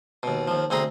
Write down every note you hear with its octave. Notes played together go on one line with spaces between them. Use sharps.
D#2 B2
D#2 F3
D2 C4 G#4 A#5